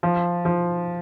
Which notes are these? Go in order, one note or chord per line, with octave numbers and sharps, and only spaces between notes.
F3
F3